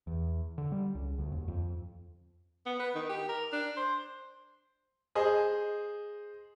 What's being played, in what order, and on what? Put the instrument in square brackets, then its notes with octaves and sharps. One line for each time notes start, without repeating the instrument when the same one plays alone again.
[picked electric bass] E2
D3
G3
C#2
D2
D#2
F2
[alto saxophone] B3
B4
D#3
G4
A#4
D4
C5
[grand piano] G#4 C5 D#5